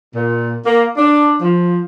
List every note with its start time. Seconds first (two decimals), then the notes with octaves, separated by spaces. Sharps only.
0.15 A#2
0.65 A#3
0.96 D4
1.41 F3